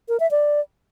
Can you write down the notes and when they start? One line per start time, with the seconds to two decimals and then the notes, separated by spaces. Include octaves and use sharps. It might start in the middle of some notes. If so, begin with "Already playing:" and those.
0.09 A#4
0.20 E5
0.31 D5